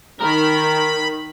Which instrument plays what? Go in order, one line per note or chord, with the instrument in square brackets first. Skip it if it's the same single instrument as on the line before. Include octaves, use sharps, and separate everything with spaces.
[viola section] D#3 [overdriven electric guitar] A#4 [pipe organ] B5